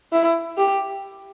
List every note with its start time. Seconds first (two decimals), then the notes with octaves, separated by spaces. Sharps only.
0.12 E4
0.57 G4